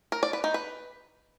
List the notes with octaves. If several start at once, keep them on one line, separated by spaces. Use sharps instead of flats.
A#4
D5
B4
D#4
B4